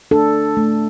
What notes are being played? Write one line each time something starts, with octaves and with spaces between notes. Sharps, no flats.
D4 A4
A3